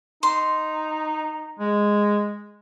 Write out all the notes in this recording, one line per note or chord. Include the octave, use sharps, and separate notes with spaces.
D#4 C6
G#3